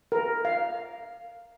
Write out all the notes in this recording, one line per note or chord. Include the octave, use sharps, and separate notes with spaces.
A#4
F5